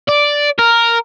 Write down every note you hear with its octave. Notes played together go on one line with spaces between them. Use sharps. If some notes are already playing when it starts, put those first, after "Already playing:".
D5
A#4